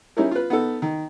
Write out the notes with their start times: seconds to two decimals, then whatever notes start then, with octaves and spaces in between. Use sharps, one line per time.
0.17 G3 C#4 D#4 E4 A#4
0.31 F4 B4
0.50 B3 D#4 A4
0.82 D#3